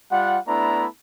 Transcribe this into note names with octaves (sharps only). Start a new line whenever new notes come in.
G3 F4 F#5
A3 B3 D4 E4 A#5